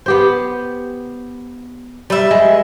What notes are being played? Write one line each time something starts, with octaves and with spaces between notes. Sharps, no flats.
B3 G4 C5
G3 B4 E5
G#3